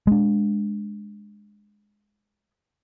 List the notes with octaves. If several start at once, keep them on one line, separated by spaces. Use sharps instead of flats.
G#3 D4